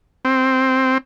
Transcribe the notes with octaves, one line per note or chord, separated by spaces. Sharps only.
C4